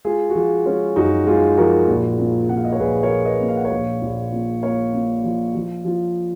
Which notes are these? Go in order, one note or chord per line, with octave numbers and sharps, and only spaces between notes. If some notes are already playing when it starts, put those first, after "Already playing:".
G#3 F4 G#4
F#4
F3 F4 G#4
G#3 C#4 F4
F#2 D#4 F#4
G#3 F4 G#4
F3 F#4 A#4
A#1
A#2
A#2 F#5
F5
D#5
C#5
A#1 G#4 B4
A#4 C#5
A#1
B4 D#5
A#2
F5
F#5
C#5 F5
A#1
A#1
A#2
A#3 C#5 F5
A#2
F3
F3
F3